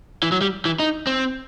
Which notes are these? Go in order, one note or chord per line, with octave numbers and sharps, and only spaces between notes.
E3
F#3
G3
E3
D#4
C4